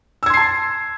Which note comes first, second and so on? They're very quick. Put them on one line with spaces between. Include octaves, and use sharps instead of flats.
E6 G#6 C6 C7 A5